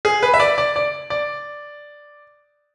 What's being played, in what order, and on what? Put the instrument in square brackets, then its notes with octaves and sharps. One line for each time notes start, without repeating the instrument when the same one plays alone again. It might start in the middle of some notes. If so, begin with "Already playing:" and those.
[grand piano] G#4
B4
E5
D5
D5
D5
D5